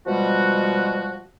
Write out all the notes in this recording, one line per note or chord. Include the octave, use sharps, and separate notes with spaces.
B2 F3 G3 G#3 F#4